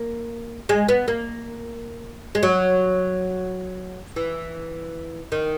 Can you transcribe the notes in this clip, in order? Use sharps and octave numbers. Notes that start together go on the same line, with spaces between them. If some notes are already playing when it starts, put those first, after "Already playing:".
Already playing: A#3
G#3
B3
A#3
G#3
F#3
E3
D#3